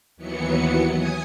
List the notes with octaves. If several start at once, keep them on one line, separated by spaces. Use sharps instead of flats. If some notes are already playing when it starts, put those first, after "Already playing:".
D#2 E3 F#3 B3 C#7
G#5 D#6 G#6